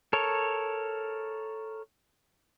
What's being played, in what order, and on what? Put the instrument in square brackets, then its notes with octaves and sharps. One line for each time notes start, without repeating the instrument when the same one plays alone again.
[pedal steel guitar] A4 A#4 C#5